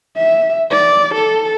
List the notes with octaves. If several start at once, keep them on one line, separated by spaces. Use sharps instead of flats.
E5
D5
A4